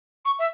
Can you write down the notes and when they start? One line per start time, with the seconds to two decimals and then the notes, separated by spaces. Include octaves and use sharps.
0.25 C#6
0.38 E5